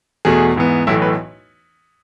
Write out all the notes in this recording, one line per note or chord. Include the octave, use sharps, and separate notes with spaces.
E2 B2 A3 G#4
G#2 E3 B3
B1 A2 E3 A3 E4
B4